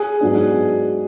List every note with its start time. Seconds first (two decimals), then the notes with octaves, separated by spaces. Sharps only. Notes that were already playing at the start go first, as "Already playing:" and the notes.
Already playing: G#4
0.21 G#2 F#3 B3 D4